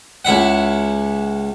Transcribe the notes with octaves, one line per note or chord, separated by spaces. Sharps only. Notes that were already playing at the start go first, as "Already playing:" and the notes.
C#2 E4 E5 F#5